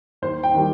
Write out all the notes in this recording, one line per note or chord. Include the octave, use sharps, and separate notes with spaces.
D#2 C5
G5
D#3 G3